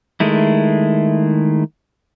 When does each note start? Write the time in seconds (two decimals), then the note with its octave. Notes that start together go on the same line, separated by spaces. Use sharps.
0.20 D#3 G#3 A3 E4